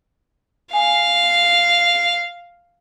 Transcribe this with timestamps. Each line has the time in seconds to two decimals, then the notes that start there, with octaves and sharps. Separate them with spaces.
0.73 F5 G#5